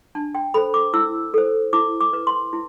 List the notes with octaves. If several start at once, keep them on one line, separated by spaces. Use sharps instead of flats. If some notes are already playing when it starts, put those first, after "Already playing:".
D4 A5
G5
A4 C5 B5
D6
E4 E6
A4 C5
E4 D6
D6
B4
C6
E4